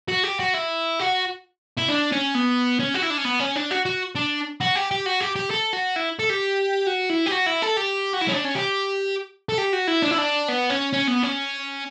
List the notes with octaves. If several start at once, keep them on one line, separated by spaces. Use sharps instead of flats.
F#4
G4
F#4
E4
F#4
E4
D4
C#4
B3
C#4
F#4
E4
D4
C#4
B3
C#4
D4
F#4
F#4
D4
F#4
G4
G4
F#4
G4
G4
A4
F#4
E4
A4
G4
F#4
E4
G4
F#4
E4
A4
G4
F#4
E4
C#4
D4
C#4
G4
A4
G4
F#4
E4
D4
E4
D4
B3
C#4
C#4
B3
C#4